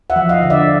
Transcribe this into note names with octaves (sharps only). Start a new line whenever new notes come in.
E5 F#5
F3
D#5 F5
D3
D5 E5